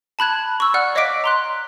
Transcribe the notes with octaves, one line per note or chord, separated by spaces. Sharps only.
A5 B5 F#6 G#6
C#6 E6
D5 F#5 F6 F#6
C#5 D#5 F5 D6 B6 D7
A#5 C6 F#6